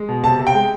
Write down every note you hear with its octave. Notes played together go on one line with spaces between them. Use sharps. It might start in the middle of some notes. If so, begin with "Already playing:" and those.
Already playing: G#3
B2
C3 A5
C3
G5
G#3